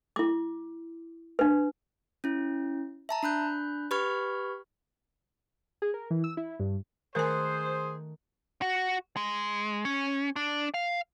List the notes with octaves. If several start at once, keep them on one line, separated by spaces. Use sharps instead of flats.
E4 D6
D4 B4
C#4 E4
E5 A5 A#5
D4 B5 F#6 G6
G4 B4 B5 C#6 F6 G#6
G#4
A#4
E3
E6
E4
G2
D#3 A3 G#4 A#4 C5 G#5 F#6
F#4
G#3
C#4
D4
F5